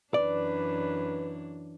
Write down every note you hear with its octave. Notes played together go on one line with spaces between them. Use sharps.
F#2 E3 D4 B4 D5